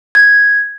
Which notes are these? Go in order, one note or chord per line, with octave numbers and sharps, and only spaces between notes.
G#6